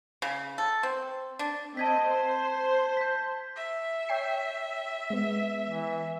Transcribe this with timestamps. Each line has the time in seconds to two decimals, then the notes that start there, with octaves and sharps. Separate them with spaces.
0.22 C#3
0.58 A4
0.83 C4
1.39 D4
1.77 C4 D#5 A5 G#6 B6
2.08 C5
2.97 G6 B6
3.56 E5
4.09 C#5 G5 C7
5.10 G#3 B3
5.68 E3